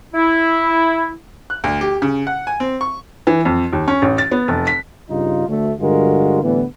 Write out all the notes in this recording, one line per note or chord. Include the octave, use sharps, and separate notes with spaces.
E4
F#6
D2
G4
C#3
F#5
G#5
C4
C#6
E3
F2
D#2
C#4
A1
A6
B3
F1
B6
G2 C#3 D#4 F4
D2 A3
G2 D3 G#3 F4 F#4 A#4
A2 D3 E3 G3 B3